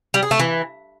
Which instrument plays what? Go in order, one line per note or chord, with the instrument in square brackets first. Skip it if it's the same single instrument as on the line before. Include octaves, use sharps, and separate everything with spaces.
[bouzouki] G3
G#4
A3
E3